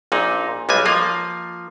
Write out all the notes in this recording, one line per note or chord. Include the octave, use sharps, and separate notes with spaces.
A#1 A#2 D#4
B1 G3 G#3 G#5
F3 A#3 F4